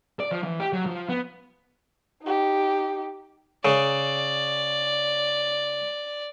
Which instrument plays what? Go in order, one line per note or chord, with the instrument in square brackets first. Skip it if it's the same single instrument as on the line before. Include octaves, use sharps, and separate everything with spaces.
[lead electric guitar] D5
F3
E3
G4
F#3
F3
B3
[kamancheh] D#4 G4
[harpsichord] C#3 [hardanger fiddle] D5